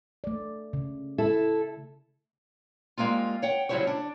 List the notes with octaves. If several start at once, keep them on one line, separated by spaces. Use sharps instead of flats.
A3 D5
C#3
E4 A4
G3 G#3 A#3 C4 F4
C#5 F#5 G5
C#3 F#3 G3 E4 C5 C#5
D4